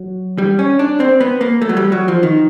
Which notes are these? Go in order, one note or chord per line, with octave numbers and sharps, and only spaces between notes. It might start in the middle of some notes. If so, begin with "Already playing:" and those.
Already playing: F#3
G3
C#4
D4
C4
B3
A#3
A3
F#3
G3
F#3
F3
D#3